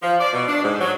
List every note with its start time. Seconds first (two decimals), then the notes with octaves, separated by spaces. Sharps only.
0.03 F3
0.20 D5
0.33 B2
0.48 D4
0.63 G#2
0.81 F#3